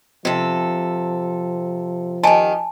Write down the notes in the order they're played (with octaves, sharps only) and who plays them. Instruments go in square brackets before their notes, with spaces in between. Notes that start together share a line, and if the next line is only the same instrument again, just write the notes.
[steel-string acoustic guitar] C3 A4 [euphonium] F3
[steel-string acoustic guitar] D#3 G4 [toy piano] G#5 A5